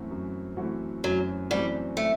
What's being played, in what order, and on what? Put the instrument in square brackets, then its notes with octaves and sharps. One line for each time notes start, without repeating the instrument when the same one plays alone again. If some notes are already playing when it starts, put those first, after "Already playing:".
Already playing: [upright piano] F#2 E3 A3 C4 F#4
F#2
E3 A3 C4 F#4
[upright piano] F#2 [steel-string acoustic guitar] F#3
[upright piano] E3 A3 C4 F#4 [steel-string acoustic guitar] G3
[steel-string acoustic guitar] A3